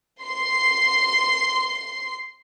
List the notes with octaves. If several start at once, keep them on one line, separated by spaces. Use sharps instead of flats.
C6 C7